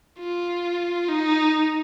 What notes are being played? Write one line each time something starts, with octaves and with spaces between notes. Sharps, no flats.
F4
D#4